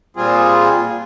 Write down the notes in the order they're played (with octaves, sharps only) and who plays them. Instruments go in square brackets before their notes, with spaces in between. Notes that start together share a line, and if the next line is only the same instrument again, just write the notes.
[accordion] A#2 G3 C4 F4 G#4